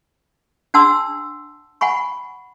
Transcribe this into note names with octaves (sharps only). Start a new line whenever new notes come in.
D4 F#5 A5 C6 E6
F#5 G#5 B5 C#6